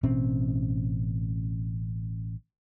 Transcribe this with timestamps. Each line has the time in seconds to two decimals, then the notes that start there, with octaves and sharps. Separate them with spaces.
0.03 A1 B2 C4 C#4